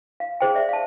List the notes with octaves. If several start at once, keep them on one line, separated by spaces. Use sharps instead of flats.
F5
G#4 C5 G5
D5 E5
F5 A5